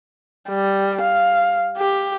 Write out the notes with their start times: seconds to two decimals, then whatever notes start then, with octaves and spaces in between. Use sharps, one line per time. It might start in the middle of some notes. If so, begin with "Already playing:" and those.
0.49 G3
1.01 F5
1.78 G4